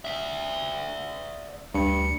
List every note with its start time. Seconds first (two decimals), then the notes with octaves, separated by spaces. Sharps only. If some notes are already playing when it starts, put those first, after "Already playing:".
0.05 D5 E5
1.74 D2 G2 C#7